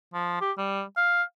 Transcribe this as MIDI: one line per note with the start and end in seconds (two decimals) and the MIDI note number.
0.14 0.40 53
0.41 0.52 67
0.58 0.82 55
0.97 1.23 77